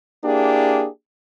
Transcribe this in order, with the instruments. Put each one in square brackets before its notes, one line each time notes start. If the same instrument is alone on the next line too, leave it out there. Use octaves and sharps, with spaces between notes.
[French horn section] A#3 D4 E4 G4 G#4